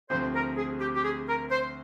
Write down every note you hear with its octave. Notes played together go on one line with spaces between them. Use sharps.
D2 C3 F3 C4 C5
A#4
G#4
G4
G4
G#4
A#4
C5